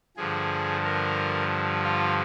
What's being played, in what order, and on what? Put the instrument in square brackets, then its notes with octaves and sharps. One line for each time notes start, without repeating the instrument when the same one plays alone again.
[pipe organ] G2 D3 F3 G#4
A#4
F4